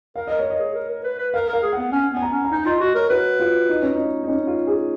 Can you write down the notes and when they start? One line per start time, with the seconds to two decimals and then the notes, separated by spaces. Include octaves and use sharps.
0.16 A#4 F5
0.27 A#4 D#5
0.39 C#5
0.46 A#4 D#5
0.60 G#4
0.74 A#4
0.90 A#4
1.04 B4
1.19 B4
1.34 A#4 F5
1.49 A#4 F5
1.63 G#4
1.73 F#5
1.78 B3
1.92 C#4 G#5
2.12 B3 G#5
2.22 A#5
2.32 C#4
2.45 A#5
2.52 D#4 G#5
2.66 F4 D#5
2.80 F#4 D#5
2.95 A#4 C#5
3.10 F#4 B4
3.40 F4
3.69 D#4
3.82 C#4
3.95 D#4
4.23 D#4
4.28 C#4
4.47 F4
4.67 G#4